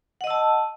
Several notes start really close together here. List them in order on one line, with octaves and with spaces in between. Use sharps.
F#5 D#5 E6 A5